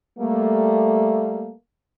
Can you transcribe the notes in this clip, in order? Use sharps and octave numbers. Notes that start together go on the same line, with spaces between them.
G3 A3 A#3